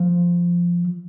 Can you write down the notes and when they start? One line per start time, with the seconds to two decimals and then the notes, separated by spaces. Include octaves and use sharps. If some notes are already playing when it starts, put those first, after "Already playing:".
Already playing: F3